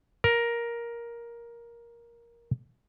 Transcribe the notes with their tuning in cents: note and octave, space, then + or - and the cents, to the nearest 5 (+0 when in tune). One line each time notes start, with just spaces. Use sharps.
A#4 +10